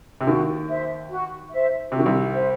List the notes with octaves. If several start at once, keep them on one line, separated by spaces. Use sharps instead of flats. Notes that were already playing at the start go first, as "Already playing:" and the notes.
C3
D#2 D#3 F#4
C5 E5
F#4
C5 E5
C3 F#4
D#3
C2 C3
C5 E5